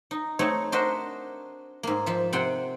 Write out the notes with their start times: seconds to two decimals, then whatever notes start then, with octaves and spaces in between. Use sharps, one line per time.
0.11 D#4
0.39 A3 C4 D#4 C#5
0.72 D4 F#4 A#4 C5 D#5 E5
1.83 G#2 A#3
2.06 F3 E5
2.33 C3 F#5 G5 C6